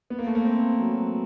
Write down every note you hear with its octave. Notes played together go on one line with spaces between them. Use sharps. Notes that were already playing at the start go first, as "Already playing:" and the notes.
B3
A#3
A3
A#3
C4
F#3